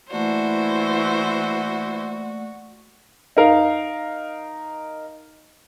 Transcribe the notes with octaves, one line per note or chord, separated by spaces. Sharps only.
E3 A3 A#3 F#4 C5 D5
D#4 A#4 F5